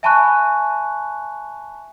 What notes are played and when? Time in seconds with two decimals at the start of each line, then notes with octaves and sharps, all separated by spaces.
0.03 E5 G#5 A5 B5 C#6 F#6